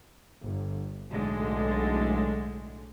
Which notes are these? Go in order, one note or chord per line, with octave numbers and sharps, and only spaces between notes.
G1
B1 A2 D3 G#3